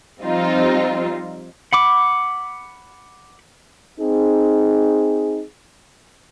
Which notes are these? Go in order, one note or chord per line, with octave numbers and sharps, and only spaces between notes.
F3 G3 C4 D#4 F4
F#5 B5 D6
C4 D#4 G#4